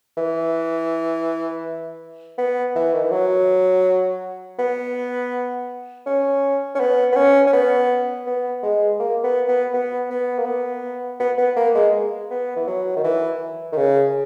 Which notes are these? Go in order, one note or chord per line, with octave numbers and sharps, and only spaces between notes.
E3
B3
E3
D#3
E3
F#3
B3
C#4
C#4
B3
B3
C#4
C#4
B3
B3
G#3
A#3
B3
B3
B3
B3
A#3
B3
B3
B3
A#3
G#3
B3
E3
F#3
D#3
E3
D#3
C#3